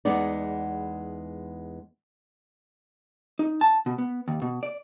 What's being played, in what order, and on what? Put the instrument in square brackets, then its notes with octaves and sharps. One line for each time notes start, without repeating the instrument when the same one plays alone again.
[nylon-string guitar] E2 G#3 B3 D#4 D5
[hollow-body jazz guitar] D#4
A5
B2
B3
D#2
B2
D5